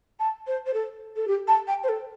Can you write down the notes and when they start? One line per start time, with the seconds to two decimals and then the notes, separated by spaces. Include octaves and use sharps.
0.19 A5
0.46 C5
0.66 C5
0.73 A4
1.16 A4
1.27 G4
1.47 A5
1.67 G5
1.83 C5
1.88 A4